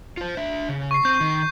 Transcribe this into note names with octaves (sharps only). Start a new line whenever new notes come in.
F4 C5
D4 E5
C#3
C#6 C7
C4 G6
D#3